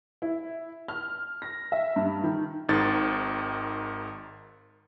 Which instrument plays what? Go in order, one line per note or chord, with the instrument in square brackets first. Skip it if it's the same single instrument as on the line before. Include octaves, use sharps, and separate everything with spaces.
[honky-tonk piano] E4
F6
A#6
E5
G2
D#3
[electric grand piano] G#1 G#2 D#3 A6